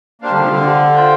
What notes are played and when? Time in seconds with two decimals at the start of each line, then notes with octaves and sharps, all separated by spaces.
0.22 A#3 D4 G4 C5 F5
0.31 D3 G3
0.39 C3 F3
0.48 D3
0.93 F4 C5 G5